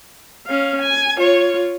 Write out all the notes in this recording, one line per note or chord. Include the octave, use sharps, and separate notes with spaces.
C#4 F5
G#5
F4 C#5